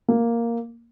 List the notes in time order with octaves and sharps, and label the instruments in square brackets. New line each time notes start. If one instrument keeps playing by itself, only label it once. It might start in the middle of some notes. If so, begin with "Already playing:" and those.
[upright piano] A#3